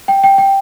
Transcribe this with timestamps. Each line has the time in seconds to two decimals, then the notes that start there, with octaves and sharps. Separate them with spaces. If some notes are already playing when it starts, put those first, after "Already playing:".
0.08 G5
0.24 G5
0.38 G5